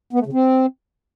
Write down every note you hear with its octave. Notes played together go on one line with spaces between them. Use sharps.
B3
A3
C#3
C4